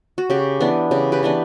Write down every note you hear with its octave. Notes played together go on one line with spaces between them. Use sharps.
F#4
C#3 G4
E3 B3 D4
C#3 G4
G4 B4
E3 B3 D4 B4